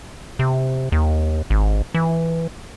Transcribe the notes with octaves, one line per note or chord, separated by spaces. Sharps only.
C3
D#2
G#1
E3